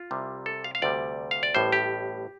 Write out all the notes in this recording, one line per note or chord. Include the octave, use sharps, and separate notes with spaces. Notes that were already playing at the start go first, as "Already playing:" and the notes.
Already playing: F4
C2 C3 G3
A4
F5
F5
D2 C3 G3 D5
F5
D5
A1 A2 G3 C5
G4